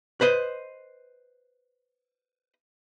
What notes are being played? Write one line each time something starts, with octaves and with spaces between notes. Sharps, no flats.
B4 C5 D#5